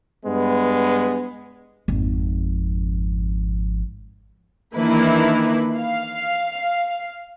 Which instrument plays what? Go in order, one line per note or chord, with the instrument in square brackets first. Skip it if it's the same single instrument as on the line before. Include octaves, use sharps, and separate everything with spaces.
[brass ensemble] G2 G#3 B3
[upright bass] G#1 F2
[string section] D#3 E3 A#3 D4 E4 B4
F5